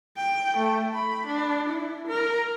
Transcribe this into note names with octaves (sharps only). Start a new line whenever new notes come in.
G5
A3
B5
D4
E4
A#4